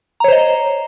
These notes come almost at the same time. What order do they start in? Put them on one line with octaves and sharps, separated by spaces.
A#5 C#5 C5 D#5